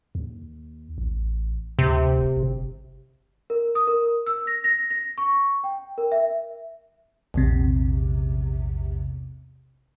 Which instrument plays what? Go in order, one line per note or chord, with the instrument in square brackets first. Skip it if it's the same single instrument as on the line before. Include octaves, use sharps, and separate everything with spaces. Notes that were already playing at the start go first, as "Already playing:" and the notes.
[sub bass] D#2
A1
[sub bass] D2 [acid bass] C3
[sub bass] D1
G1
[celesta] A#4
D#6
A#4
E6
A#6
A#6
A#6
C#6
G5
A#4
E5
[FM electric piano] A#1 E2 C3